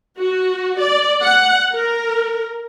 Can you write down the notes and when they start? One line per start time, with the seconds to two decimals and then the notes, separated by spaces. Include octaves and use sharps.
0.18 F#4
0.80 D5
1.23 F#5
1.74 A#4